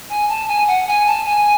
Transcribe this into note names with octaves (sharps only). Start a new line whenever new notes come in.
G#5
A5
G#5
F#5
G#5
A5
G#5